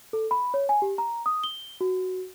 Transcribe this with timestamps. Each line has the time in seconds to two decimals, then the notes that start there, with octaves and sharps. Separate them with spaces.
0.13 A4
0.31 B5
0.54 C#5
0.69 G#5
0.82 G4
0.98 A#5
1.26 D#6
1.44 G7
1.81 F#4